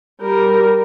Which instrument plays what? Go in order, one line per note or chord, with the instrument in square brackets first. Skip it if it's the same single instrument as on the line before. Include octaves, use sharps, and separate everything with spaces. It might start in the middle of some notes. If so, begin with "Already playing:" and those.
[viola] G3 A#4